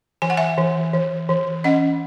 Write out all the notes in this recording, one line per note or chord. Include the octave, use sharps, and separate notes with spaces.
E3 G#5
F#5
E5 G#5
E3
E3
E3
C#4 D#5 F#5